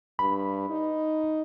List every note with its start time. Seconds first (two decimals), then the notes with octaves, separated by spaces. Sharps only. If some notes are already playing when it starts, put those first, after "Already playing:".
0.19 G2 B5
0.69 D#4